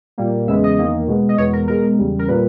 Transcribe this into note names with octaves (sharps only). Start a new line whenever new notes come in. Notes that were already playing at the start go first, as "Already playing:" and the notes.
A#2 G3 A#3
E2 C#3 G#3 B3 E5
D#5
E2 D#3 A#3
B2 G#3 B3
D#5
E2 B2 G#3 B3 C#5
A#4
B2 G#3 B3 A#4
E2 C#3 G3
A#4
A#2 G3 A#3 B4